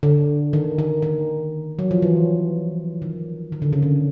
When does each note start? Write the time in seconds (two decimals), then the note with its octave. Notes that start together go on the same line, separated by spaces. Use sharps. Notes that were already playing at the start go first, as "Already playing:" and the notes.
0.03 D3
0.53 D#3
0.79 D#3
1.02 D#3
1.79 F#3
1.91 F3
2.02 E3
3.02 D#3
3.52 D#3
3.62 D3
3.73 C#3
3.82 D3